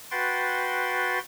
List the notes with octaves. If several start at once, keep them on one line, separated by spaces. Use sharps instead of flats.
F#4 B4 G5 C6 A6